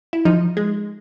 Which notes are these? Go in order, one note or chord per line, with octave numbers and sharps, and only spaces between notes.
E4
F3 D#4
G#3